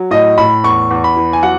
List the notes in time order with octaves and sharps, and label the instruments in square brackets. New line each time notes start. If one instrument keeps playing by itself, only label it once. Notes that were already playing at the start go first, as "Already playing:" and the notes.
Already playing: [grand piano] F#3
A2 D#5
A2 B5
E2 C#6
E2
B5
E3
G#5
F#3 F#5